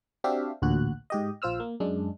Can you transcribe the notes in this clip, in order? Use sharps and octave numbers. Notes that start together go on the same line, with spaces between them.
C4 D4 F#4 G4 E5 F5
A1 D2 A#2 F#4 F#6
G#2 G4 D#5
A#1 F4 C5 E6 F6
A#3
F#2 G#3 D4